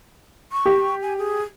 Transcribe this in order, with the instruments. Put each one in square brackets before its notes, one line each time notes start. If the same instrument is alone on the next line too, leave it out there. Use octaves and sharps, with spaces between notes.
[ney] C#6
[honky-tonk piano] G4
[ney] G#5
G#4